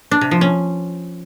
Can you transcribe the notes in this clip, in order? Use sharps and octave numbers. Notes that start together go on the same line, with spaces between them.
D4
C3
F3
C#4